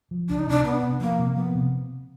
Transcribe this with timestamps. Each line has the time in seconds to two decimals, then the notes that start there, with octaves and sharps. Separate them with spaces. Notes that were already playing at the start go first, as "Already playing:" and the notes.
0.11 F3
0.29 C#2 D4
0.39 D#4
0.47 C3 D4
0.65 C3 B3
0.83 C3
1.00 F3 A#3
1.19 C3
1.36 F3 B3
1.55 C3